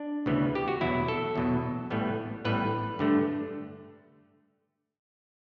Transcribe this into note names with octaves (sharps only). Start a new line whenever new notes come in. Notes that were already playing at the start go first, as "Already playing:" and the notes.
Already playing: D4
D2 C#3 E3 B3
G4
F#4
E2 B2 F#3 E4
A4
E2 B2 F#3
A1 A2 E3 G3 B3
A1 A2 E3 G3 B3 B4
G2 D3 A3